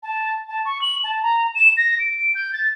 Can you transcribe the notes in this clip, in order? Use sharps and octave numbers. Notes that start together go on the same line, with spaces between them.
A5
A5
C#6
F#7
A5
A#5
E7
A#6
D7
G6
A6